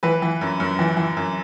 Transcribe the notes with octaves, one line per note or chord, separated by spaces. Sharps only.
E3 B4
E3
F#2
F#2
E3
E3
F#2